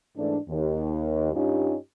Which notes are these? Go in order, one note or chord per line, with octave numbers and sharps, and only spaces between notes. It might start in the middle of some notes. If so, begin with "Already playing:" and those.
G#2 E3 A3 D4
D#2
G2 G3 C#4 D#4 F4 G4